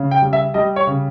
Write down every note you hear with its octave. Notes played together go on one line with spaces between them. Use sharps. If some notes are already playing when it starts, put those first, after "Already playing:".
Already playing: C#3
G5
G3
E5
G3 D#5
C#5
C#3